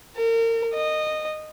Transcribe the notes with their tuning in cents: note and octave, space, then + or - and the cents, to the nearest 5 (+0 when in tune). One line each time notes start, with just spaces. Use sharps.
A#4 -35
D#5 -15